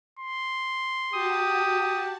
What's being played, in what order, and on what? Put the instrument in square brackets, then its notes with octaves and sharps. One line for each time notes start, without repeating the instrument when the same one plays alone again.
[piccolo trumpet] C6
[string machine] F#4 A5 [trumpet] G4 [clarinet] D#6